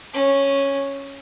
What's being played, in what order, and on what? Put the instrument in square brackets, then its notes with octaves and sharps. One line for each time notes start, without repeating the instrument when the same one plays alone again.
[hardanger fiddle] C#4